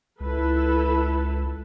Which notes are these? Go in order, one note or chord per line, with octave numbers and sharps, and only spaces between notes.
C#2 E4 A4 B4